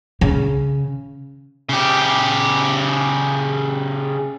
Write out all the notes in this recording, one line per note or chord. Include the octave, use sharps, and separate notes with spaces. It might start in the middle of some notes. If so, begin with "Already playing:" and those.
C#3
C#3 G4